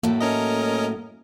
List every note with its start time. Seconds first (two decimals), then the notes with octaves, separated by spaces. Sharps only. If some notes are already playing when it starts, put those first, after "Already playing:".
0.03 A2 F#3 A3 A#3
0.21 C#4 A#4 D#5